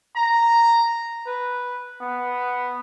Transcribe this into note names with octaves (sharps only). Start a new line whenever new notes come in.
A#5
B4
B3